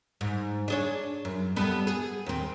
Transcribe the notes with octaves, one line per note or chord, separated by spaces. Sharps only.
G#2
D4 G#4 C#5
F#2
G3 B3 A4
G#4
D#2 C4